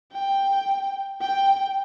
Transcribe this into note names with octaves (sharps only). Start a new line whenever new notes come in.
G5
G5